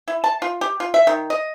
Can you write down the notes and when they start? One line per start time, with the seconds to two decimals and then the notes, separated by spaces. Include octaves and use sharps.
0.08 E4
0.24 A5
0.42 F4
0.61 G4
0.80 F4
0.94 E5
1.07 D#3
1.30 D#5